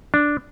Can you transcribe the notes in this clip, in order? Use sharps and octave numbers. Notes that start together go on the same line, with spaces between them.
D4